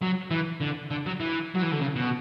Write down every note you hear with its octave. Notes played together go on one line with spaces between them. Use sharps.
F#3
E3
D3
D3
F#3
E3
F#3
E3
D3
C#3
B2